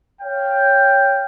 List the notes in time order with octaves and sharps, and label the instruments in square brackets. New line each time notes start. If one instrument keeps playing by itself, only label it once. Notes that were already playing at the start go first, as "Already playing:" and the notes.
[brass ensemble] C#5 F5 G5